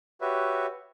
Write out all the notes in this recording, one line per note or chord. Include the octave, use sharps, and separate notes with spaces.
F#4 G4 B4 C#5 E5